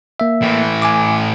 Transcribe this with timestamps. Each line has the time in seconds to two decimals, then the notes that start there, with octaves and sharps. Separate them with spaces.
0.20 A#3 E5
0.42 A2 E3
0.82 G#5 D6